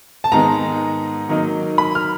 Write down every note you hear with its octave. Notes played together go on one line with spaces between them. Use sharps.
A5
G#2 D#3 G#3 B3 A#5
D#3 F#3 A#3 D#4
B5
F6